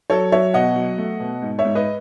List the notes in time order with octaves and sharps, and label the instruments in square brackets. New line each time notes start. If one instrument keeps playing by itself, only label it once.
[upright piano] F#3 A4 C#5
F#3 C#5 E5
B2 D#5 F#5
F#3
A3
B2
G#2
C#5 E5
G#2
B4 D#5